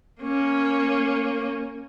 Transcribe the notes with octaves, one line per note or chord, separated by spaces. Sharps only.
A#3 C#4